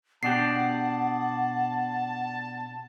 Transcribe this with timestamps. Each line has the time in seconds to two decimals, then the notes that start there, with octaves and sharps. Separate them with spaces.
0.23 B2 D4 G4 F#5 A5 C7